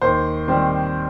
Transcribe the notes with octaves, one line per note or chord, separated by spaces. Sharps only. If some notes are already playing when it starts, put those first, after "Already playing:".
D#2 C5
D#3 G3 C4